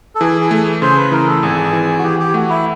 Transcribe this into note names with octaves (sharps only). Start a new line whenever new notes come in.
A4
E3 G#4
G#4
A3
C#3 C5
B4
E3 A#4
A4
G#1 G#4
E3
F#4
E3 G4
G4
A3 F#4
E4